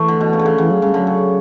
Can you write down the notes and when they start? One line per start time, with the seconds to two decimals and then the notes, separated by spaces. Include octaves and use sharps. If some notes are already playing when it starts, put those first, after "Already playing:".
Already playing: E3 A3
0.08 D3
0.20 B2
0.33 C#3
0.39 D3
0.46 C#3
0.58 C#3 E3
0.71 F#3
0.82 C#3 G3
0.94 D3 F#3
1.07 C#3